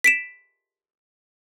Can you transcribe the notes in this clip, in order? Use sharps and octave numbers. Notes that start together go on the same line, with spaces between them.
B6 D7 E7